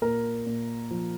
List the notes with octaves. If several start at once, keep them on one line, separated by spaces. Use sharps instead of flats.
A#2 A#4
A#2
F3